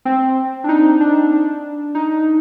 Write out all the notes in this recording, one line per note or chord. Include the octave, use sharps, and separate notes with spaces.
C4
D4
D#4
D4
D4
D#4